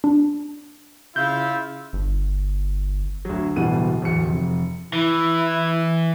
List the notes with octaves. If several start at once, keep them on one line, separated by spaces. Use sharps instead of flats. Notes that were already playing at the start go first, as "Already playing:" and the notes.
D4
C#3 E4 F4 F5 G6
G1
D2 F#3
D1 B2 E3 G3 F#5 D#7
D1 E2 C#7
F1
E3 E4